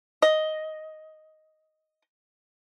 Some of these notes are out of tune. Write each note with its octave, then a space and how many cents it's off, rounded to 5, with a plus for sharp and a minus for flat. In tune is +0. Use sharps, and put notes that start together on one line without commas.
D#5 +5